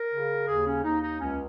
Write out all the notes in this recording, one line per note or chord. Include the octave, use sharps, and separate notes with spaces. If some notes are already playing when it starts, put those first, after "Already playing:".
Already playing: A#4
C#3
D#2 G#4
C#4
D#2 D#4
D#4
C#2 C#4